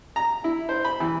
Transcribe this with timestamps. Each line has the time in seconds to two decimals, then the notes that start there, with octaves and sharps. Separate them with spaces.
0.16 A#5
0.44 E4
0.69 C5
0.84 B5
1.00 E3